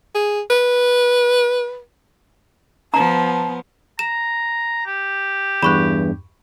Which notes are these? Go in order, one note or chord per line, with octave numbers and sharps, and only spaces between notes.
G#4
B4
F3 B3 A5 A#5
A#5 E7
G4
E2 G2 B5 C#6 F#6